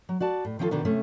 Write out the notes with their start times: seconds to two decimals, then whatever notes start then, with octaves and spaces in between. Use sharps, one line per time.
0.09 F#3
0.20 F#4 D5 A5
0.45 A2
0.59 D#3 F3 C#4 F4 A4
0.71 B2 D3 D#3 B3 D4
0.85 C3 A3 C#4